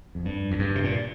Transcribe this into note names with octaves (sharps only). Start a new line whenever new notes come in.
F2
G2
F2
G2
C3
A#2